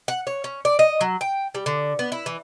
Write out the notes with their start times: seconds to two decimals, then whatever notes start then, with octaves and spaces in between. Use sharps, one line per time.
0.08 F#5
0.27 C#5
0.44 C#4
0.65 D5
0.79 D#5
1.01 F#3
1.21 G5
1.55 G3
1.66 D3
1.99 B3
2.12 E4
2.26 E3